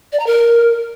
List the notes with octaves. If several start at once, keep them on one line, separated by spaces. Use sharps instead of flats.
D5
A#5
A#4